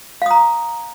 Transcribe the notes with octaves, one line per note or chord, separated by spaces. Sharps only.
F5 A#5 D#6